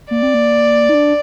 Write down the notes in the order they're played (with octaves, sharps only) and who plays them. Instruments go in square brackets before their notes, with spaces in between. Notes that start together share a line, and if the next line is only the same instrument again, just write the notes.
[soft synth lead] A#3 [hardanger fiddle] D5
[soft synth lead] C4
A#3
D#4
D4